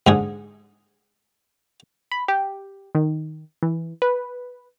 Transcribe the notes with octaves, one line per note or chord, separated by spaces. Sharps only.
G#2 D3 G#4
B5
G4
D#3
E3
B4